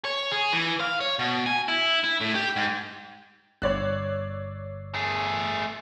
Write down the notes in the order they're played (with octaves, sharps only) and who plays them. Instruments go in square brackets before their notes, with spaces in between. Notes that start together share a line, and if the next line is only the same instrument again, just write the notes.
[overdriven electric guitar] C#5
G#4
E3
F5
C#5
B2
G#5
E4
E4
A2
G4
G#2
[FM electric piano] G1 E6 C7 [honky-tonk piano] C#5 D5 F#6
[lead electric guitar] A3 G#4